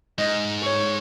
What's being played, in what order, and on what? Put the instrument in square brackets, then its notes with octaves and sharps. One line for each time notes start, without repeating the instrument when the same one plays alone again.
[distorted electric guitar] G#2 [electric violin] D#5
[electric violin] C#5